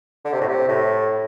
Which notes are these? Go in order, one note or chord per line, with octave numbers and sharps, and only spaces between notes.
D3
C3
A2
C3
A2